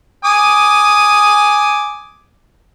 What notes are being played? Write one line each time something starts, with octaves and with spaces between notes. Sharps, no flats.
G#5 D6 D#6